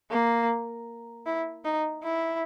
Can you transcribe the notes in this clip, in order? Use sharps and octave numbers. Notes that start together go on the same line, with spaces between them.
A#3
E4
D#4
E4